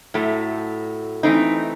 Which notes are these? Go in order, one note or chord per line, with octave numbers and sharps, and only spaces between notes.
A2 F#3 A3
E3 A3 C4 D#4